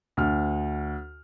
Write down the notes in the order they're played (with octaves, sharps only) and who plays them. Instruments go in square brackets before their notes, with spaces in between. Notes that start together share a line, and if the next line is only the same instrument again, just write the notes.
[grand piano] D2 F6